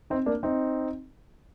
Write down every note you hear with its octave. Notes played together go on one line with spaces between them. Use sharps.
C4 D#4
A#3 D4
C4 D#4